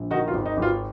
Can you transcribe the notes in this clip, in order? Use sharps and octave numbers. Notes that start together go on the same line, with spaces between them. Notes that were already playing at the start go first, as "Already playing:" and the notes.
Already playing: A#1
D#3 D#4 F#4
F4
G#1
D#4
G#1
F4